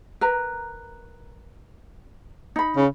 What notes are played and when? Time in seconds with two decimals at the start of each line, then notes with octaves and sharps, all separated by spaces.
0.21 A#4 B4 A#5
2.56 D#4 B5
2.76 C#3